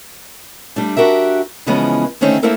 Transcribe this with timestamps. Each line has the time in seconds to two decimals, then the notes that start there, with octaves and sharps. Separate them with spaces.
0.76 G3 A3 D4
0.97 D4 F#4 G4 A#4 E5
1.66 C#3 E3 F3 G#3 B3 C#4
2.21 D3 D#3 A3 C4 C#4 D#4
2.43 A3 A#3 C4 E4 A4 A#4